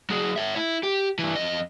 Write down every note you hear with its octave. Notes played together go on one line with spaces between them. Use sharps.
F#3 G#4
C#5 E5
E4
G4
G2 E3
F2 D#5